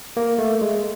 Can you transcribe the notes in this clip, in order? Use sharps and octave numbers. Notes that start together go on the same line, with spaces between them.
A#3
A3
G#3